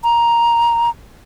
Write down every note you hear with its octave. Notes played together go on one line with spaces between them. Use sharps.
A#5